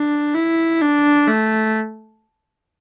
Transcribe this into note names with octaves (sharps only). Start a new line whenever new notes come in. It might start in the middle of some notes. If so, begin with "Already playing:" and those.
Already playing: D4
E4
D4
A3